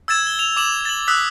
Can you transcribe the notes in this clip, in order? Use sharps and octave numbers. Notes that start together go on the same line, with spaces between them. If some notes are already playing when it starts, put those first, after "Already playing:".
E6 G#6 A6 E7
G7
F7
D6 E7 F#7
A6 F#7
D#6 E6 F#6 B6